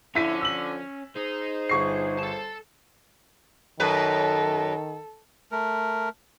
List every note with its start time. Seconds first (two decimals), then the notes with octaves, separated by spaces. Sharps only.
0.15 D3 F3 C#4 E4 B6 D#7
0.41 E6 F#7
1.16 D#4 G#4 C5
1.69 G1 C#6 C7
2.19 A4 A5
3.80 F#2 D#3 A4 B4
5.52 A3 A#4